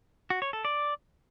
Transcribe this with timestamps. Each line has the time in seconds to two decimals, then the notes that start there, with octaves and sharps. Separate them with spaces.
0.30 F#4
0.42 C#5
0.53 A4
0.65 D5